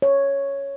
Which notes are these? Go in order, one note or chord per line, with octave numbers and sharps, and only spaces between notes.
C#5